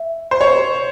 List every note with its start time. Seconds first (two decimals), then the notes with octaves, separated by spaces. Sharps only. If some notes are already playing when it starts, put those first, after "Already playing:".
Already playing: E5
0.31 C5
0.41 C#5